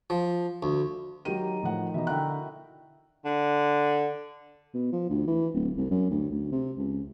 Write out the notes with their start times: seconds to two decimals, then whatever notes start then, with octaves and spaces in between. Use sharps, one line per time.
0.10 F3
0.63 D2
1.25 D#3 F#3 G4 D#7
1.63 A2 F3 F#5
1.94 B2 E3 D#4 E5
2.07 D3 E4 F#4 G5 F#6
3.25 D3
4.74 B2
4.92 F3
5.09 D2
5.27 E3
5.54 D1
5.77 C2
5.91 F#2
6.10 D2
6.31 D2
6.52 C3
6.78 C#2